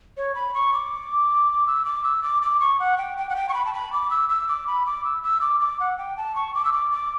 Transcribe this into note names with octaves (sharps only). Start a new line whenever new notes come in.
C#5
B5
C#6
D6
E6
D6
E6
D6
D6
C#6
F#5
G5
G5
F#5
G5
C#6
B5
A5
B5
D6
E6
E6
D6
B5
D6
E6
E6
D6
D6
F#5
G5
A5
C#6
D6
E6
D6
D6